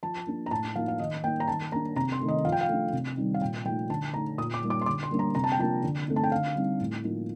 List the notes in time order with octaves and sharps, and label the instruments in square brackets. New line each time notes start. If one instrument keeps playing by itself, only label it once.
[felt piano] F3 A5
A#3 D4
A#5
A2 A5
F3 A#3 D#4 F5
F5
D#3 D#5
A#3 D#4 G5
A#5
D#3 A5
A#3 A#5
D4
C3 A#5
C6
D#3 A3
D#5
F3 F5
G5
F5
A3 D4
C3
D#3 G3 C4 D#4
F5
A#2 G5
F3 A3 D#4 G5
D3 A5
A3 D#4 A#5
A#2 D#6
D6
G3 A#3 D#4
D6
C6
D3 D6
C6
G3 A#3 D4
A#5
C3 A#5
A5
G5
F3 A#3 D4 A5
D3
A3 C4 D#4
A5
G5
D3 F5
G3 C4 D#4
A2
F3 A#3 D#4